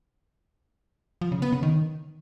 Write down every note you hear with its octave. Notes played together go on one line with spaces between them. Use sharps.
F3
C#3
B3
C#3
D#3